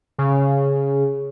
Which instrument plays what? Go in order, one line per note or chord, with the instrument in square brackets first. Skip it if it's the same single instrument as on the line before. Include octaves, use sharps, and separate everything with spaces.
[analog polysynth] C#3